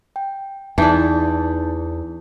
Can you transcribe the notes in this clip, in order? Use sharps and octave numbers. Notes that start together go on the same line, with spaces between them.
G5
E2 E3 D4 D#4 A5 G6